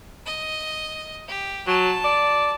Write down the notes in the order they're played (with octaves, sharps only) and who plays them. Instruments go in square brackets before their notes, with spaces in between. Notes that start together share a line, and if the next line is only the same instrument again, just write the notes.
[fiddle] D#5
G4
[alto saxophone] F#3 [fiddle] A5
[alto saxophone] D5